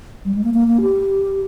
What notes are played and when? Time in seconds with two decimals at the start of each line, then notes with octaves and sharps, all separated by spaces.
0.25 G3
0.34 G#3
0.43 A#3
0.54 A#3
0.67 A#3
0.81 G4